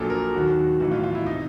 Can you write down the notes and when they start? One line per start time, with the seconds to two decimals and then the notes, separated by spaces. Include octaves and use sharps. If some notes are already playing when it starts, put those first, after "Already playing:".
Already playing: A#1 A#2 F#3 A4
0.10 A#4
0.34 D#2 D#3 F#3 F#4
0.80 B1 A2 E3 F#4
0.92 F4
1.04 F4
1.15 E4
1.26 C3 D#4